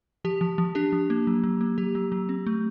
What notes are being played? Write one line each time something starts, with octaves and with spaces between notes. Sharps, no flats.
F3 G4
F3
F3
D4 G4
F3
A#3
F#3
F#3
A#3
F#3 G4
F#3
F#3
C4
A3